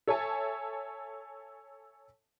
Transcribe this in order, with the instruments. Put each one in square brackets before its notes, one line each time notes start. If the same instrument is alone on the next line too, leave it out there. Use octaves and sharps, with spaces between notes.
[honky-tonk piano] A4 C#5 E5 G#5 A5